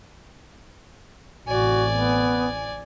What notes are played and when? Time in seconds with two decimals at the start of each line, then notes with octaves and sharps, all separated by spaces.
1.47 A1 C3 F#4 D5 G#5
1.91 B3